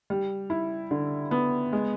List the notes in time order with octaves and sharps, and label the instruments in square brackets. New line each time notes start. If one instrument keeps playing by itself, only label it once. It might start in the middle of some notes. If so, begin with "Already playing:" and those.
[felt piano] G3
E4
D3
B3
G#3